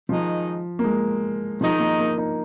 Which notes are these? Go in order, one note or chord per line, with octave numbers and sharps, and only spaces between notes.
D#3 F3 G#3 D#4
A#3
G#3
D#3 F3 G#3 D#4
A#3
A#3
D#4